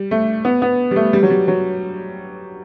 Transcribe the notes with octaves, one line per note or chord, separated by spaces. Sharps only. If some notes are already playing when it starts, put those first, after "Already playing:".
Already playing: G3
A3
B3
B3
G3
A3
G3
F#3
G3
F#3